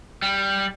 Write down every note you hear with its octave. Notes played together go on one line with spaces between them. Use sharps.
G3